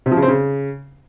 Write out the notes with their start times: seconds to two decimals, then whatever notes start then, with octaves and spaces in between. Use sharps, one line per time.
0.06 C3
0.11 F3
0.17 C#3
0.22 C4
0.28 C#3